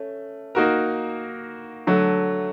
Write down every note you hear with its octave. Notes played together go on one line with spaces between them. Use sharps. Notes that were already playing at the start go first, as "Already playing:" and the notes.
Already playing: A3 C#4
A#3 D#4 F#4 A#4
D3 F#3 A3